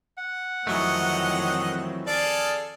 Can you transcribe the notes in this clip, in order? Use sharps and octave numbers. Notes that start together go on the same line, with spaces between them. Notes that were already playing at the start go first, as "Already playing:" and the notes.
F#5
F2 D#3 E3 F#3 A3 C4 C#5 D#5
G#4 A4 D5 F5